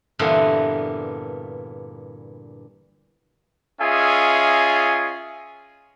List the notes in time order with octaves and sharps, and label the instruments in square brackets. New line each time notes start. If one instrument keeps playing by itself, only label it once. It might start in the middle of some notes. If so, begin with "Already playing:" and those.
[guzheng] G2 A#2 D3 E3 B3 C4
[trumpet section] C#4 F4 G#4 D#5 E5 G#5